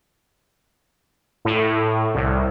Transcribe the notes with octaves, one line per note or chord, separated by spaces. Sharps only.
A2
C2